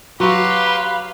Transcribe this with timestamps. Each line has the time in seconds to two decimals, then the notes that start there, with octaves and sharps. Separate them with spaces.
0.20 F#3 F#4 G4 B4 F5 B5 C6